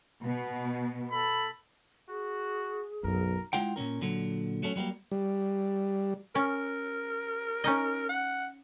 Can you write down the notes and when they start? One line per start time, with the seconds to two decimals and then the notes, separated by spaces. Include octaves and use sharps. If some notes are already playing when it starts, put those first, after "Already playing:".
0.24 B2
1.11 A4 B5
2.09 F#4 G#4
3.04 B1 F#2 A#4
3.53 G#3 E4 F4 F#5 G5
3.76 A#2 D#3 C#4 A#4
4.01 A#2 D3 F#3
4.63 F#3 A3 C#4
4.76 F#3 G3 A3 A#3
5.11 G3
6.35 C#4 A#4
7.64 C#4 D#4 D#5
8.09 F#5